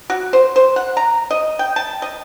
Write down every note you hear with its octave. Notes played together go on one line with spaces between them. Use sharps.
F#4
C5
C5
F#5
A#5
D#5
G5
A5
D#5